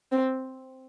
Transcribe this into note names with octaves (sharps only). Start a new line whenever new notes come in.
C4